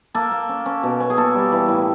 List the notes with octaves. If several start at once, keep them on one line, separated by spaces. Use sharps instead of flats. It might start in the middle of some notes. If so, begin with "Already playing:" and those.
A#3 A4
A#3
C#4
C#4
B2
C#4
G#4
A#3 A4
G3
E3
A2